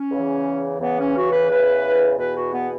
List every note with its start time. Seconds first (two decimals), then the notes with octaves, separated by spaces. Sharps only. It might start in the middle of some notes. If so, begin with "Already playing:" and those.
Already playing: C#4
0.11 E2 C#3 E3
0.80 E2 C#3 E3 B3
0.97 C#4
1.15 F#4
1.32 B4
1.49 E2 C#3 E3 B4
2.18 E2 B2 B4
2.35 F#4
2.53 B3